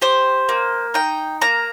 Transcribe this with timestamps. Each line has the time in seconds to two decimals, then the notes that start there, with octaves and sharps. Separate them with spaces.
0.02 G4 C5
0.49 A#3
0.94 D#4 G5
1.41 A#3 A#5